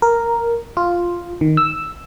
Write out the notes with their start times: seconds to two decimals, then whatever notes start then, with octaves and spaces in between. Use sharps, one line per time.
0.02 A#4
0.77 F4
1.41 D#3
1.57 E6